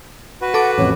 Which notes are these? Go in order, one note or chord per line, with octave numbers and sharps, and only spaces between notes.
F#4 B4
A4 F#5 D6
A1 F2 C#5